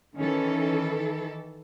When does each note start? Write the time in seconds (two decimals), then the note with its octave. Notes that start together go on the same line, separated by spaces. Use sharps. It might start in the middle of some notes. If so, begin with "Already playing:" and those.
0.16 D#3 E3 C#4 A4